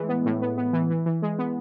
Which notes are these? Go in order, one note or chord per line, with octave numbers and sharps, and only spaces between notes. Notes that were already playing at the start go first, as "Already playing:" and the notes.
Already playing: A2 E3 G#3
B3
A2
B3
B3
E3
E3
E3
G#3
B3